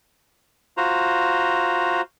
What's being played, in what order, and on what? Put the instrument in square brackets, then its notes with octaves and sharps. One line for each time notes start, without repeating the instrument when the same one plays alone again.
[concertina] F4 F#4 C5 A#5